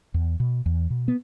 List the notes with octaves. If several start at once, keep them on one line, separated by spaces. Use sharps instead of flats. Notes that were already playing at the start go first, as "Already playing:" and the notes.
E2
B2
E2
B2
B3